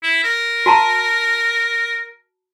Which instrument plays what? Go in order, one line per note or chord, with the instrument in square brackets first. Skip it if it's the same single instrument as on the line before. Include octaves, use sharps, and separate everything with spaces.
[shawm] E4
A#4
[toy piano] F#4 A5 A#5